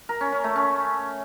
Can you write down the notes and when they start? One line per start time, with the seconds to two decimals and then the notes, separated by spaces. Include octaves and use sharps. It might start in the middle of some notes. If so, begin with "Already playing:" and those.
0.09 A#4
0.21 C#4
0.32 C#4
0.44 A3
0.56 C#4